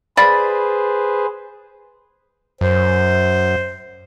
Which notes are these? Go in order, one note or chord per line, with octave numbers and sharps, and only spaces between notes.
G#4 B4 C5 D5 F5 B5
F#2 C5